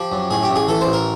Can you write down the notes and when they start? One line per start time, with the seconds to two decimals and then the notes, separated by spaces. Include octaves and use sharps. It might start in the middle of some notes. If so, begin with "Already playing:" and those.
Already playing: F3 G4
0.12 F#2
0.31 A2 G#4
0.43 G4
0.49 A1
0.56 G#4
0.68 E3 A4
0.81 C5
0.87 A1
0.93 A#4